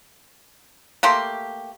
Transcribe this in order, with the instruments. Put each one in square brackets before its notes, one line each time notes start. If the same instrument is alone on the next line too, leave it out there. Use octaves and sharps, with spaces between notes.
[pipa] A3 A#3 G4 C6